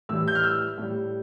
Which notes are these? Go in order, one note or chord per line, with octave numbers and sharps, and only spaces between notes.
A2 E3 G3 E6
G6
F6
E6
A2 G3